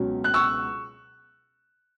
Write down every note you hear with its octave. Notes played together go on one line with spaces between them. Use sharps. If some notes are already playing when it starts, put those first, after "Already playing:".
Already playing: C#2 B2 F#3 C#4
F#6
C#6 E6